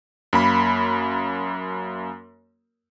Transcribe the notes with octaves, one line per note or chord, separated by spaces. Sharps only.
F#2 A#3 B5